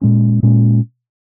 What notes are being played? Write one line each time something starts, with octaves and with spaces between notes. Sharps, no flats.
A#2 G#3 C#4
A#2 G#3 C#4